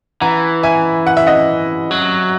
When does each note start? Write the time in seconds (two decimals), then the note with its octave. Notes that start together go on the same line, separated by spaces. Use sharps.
0.21 E3 F#5 A#5
0.63 E5 G#5
1.07 F#5
1.17 E5
1.27 D#5 F#5
1.91 F#3